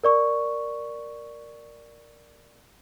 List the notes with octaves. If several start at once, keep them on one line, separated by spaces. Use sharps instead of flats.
A#4 D5 C#6